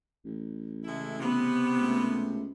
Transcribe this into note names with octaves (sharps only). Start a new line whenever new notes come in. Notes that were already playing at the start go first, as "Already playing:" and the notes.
A1
C#3 G#3 A3 E4
C3 B3
C#2 A3